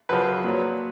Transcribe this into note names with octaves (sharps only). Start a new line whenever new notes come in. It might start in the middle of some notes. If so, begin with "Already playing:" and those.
F#2 C#3 F3 B4
A#2 F#3